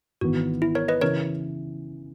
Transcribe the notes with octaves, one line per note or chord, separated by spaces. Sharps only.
G#1 G#2 E3 B3 F#4
E4
A#4 C#5
B4 D#5
C#3 E3 A#4 C#5